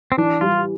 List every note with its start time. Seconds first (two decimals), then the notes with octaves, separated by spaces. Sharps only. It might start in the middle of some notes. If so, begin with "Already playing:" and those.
0.12 C4
0.18 E3 D4
0.41 G3 F4